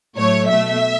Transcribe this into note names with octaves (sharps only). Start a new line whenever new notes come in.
A2 F#3 A3 C#5
B2 A3 E5